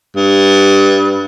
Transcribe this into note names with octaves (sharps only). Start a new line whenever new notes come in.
G2